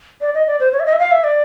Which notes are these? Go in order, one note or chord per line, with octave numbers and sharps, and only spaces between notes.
D5
D#5
D5
C5
C#5
E5
D#5
E5
F5
E5
D5